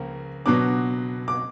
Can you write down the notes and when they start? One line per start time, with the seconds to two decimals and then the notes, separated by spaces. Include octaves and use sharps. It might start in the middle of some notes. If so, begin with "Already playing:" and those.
Already playing: C#2 C#3 F3 A#3
0.46 B2 F#3 B3 D4 D6
1.28 D6